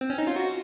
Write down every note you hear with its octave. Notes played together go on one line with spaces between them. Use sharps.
C4
C#4
D#4
F4
F#4